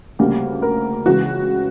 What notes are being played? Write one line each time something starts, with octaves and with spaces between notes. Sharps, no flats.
D2 C#3 G3 A#3
A#4
C#2 C#3 E3 F#4